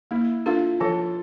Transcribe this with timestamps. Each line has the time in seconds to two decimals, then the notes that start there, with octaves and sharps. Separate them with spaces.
0.11 A#3 E4
0.46 D4 F4 A4
0.80 F3 A4